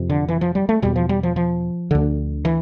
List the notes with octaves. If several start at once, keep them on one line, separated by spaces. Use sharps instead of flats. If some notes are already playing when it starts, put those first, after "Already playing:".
Already playing: F2 C3
D3
E3
F3
G3
A3
E2 B2 G3
F3
G3
F3
F3
D2 D3
E3